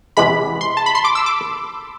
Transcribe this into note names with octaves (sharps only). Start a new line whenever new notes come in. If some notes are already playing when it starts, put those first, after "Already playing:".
E2 C3 E3 G#3 B5
C6
A5
B5
C6
D6
E6
D6